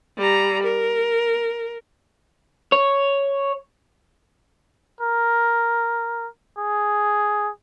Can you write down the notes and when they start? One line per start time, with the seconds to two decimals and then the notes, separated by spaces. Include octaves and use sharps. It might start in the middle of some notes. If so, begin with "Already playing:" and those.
0.18 G3 A#5
0.63 A#4
2.72 C#5
5.01 A#4
6.58 G#4